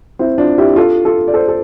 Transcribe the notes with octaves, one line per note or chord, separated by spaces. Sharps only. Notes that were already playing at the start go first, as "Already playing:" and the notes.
C4 E4
D4 F4
E4 G4
F4 A4
F4 A4
D5
A4 C5
A4